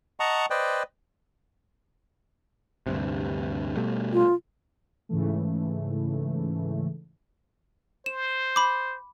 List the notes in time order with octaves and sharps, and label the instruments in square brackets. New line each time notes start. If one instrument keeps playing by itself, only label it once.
[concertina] D#5 F#5 A5 A#5 C#6
B4 C5 D5 D#5 G5
[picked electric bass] D2 G2 C3
B2 G3 A3
[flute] F4
[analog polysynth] G#2 C#3 E3 A3
[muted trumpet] C5 [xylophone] E7
[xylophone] B5 D6